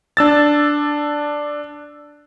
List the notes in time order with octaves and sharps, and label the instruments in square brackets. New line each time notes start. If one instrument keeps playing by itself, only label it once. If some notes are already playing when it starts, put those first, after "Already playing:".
[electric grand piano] D4 E6 A6